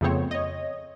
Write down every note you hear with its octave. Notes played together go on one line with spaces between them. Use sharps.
F2 C#3 A3 B3 C4 C#5
C#5 D#5